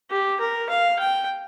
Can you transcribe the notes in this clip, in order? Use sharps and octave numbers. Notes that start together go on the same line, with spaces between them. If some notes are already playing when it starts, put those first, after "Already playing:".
G4
A#4
F5
G5